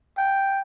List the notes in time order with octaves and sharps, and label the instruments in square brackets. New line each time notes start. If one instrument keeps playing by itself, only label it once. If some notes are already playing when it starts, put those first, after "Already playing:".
[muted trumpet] G5